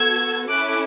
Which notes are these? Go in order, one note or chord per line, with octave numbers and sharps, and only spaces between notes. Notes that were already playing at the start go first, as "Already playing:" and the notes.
Already playing: B3 F#4 A4 E6 G#6
C#4 E4 A4 D6 F#6